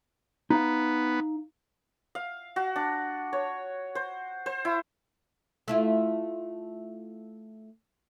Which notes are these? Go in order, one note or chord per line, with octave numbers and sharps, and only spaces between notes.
B3 D#4 F5
F5
F#4
D4
C#5
C5
C5
E4
A3 E4 F4